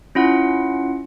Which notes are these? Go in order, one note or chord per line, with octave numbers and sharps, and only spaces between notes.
C#4 E4 F4 F#5